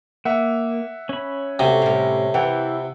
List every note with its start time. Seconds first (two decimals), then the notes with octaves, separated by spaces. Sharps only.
0.25 A#3 E5 F#5
1.09 C#4 B5
1.59 C3 A3 F#4
1.82 A2 G3
2.34 E3 F#5 G5